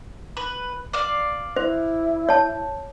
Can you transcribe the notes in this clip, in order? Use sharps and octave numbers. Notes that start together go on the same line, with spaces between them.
B4
D5 F5
E4 C5
C#5 A5